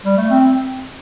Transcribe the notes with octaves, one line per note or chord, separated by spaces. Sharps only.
G3
A3
C4